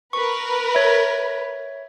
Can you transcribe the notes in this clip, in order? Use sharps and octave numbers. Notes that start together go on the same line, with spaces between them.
A#4 B4 C#6
C#5 E5